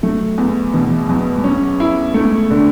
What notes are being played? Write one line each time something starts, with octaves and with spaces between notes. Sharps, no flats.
F#3 A3
E2
B2 E3
E3
E2 F#3
G#3
F#3 C#4
E4
G#3 A3
D3